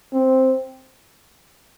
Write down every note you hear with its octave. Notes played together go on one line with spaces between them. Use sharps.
C4